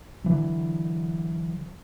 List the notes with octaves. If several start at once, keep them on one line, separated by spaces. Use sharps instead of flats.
D3 E3 F#3